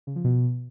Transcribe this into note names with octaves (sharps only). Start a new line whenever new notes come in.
C#3
F3
B2